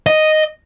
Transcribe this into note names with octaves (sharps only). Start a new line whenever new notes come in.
D#5